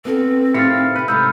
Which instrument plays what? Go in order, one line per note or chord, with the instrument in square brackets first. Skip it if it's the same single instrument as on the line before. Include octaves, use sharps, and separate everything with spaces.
[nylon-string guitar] B3 F4 A4 [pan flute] C4
[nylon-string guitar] A2 D#3 G4 [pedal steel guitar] E4 C5 F5 [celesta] A6 C#7
[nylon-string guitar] C3 C4 [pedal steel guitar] B4
[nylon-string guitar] G#2 C3 A3 [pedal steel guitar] D#4 F6 [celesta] B5 E6 G6